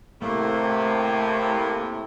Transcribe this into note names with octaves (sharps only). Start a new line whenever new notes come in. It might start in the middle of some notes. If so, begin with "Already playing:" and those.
A2 C3 A3 A#3